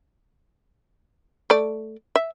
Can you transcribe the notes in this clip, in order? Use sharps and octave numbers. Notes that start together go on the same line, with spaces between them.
A3 D5
E5